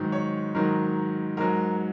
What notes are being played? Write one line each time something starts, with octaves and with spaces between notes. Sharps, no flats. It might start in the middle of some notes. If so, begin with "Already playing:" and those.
Already playing: G#2 D#3 F#3
C#5
G#2 D#3 F#3 A#4
G#2 F#3 A#4